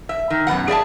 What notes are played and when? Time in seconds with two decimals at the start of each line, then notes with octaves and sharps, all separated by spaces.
0.09 E5
0.30 D#3
0.47 F#2 B2 B3 F#5
0.68 G#4 D5 E5 A5